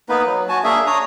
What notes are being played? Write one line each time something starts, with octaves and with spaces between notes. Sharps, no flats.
A#3 B3 D#4 B4
F#3
F#4 G#5 A5
A#3 D4 G#4 E5
D4 C#5 A#5 D#6